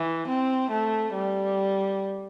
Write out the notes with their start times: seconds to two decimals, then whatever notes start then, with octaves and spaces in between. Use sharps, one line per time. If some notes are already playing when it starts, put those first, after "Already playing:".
Already playing: E3
0.28 C4
0.71 A3
1.14 G3